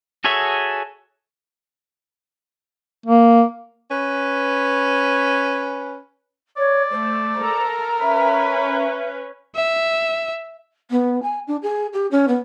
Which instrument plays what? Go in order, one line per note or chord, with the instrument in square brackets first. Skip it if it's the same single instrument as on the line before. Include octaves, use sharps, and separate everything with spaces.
[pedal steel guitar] F#4 G#4 A4 C#5 E5
[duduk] A#3
[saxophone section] C#4 B4
[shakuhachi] C#5 [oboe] D5
[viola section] A3 [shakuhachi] C5
[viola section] A4 A#5 [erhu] A#4
[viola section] C#4 B4 [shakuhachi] E5 [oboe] B5
[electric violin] E5
[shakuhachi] B3
G#5
D4
G#4
G4
C#4
B3